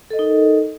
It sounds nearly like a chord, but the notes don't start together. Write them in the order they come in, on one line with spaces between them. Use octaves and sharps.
A4 D#5 A#4 D#4